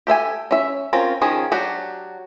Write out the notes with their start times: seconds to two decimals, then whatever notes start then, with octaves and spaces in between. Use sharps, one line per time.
0.07 G4 A4 E5 G#5
0.51 C#4 E5
0.93 C4 C#4 F4 A#4
1.22 D#3 F3 C#4 G#4
1.52 F#3 D4 F#4 G4